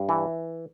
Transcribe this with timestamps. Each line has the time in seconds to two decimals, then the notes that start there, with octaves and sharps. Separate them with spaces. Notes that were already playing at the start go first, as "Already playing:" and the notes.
Already playing: G2
0.09 E3